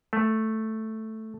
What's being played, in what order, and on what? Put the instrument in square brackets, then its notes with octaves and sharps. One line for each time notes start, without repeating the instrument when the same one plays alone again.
[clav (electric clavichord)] A3